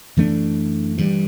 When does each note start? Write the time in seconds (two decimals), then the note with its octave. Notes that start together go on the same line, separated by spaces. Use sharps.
0.17 F#2 E3 A3 D4
0.98 G2 E3 G3